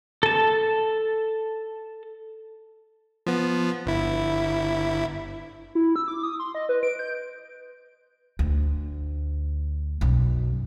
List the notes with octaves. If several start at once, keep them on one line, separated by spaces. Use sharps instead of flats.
A4 A5
F3 B3
G1 E4
E4
E6
D6
D#6
C6
D#5
B4
D7
G6
D2
B1 F#2